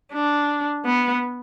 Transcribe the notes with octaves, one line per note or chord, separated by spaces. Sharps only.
D4
B3